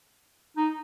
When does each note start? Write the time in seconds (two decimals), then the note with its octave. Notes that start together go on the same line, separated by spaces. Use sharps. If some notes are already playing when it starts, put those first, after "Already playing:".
0.57 D#4